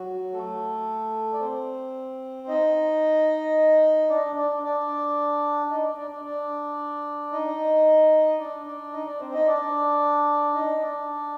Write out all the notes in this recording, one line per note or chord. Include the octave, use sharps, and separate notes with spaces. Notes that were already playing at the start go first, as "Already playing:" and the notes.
Already playing: F#3 F#4
A3 A4
D5
C4 C5
D#4 D#5
D4 D5
D4 D5
D4 D5
D#4 D#5
D4 D5
D4 D5
D4 D5
D4 D5
D#4 D#5
D4 D5
D4 D5
D#4 D#5
D4 D5
C4 C5
D#4 D#5
D4 D5
D#4 D#5
D4 D5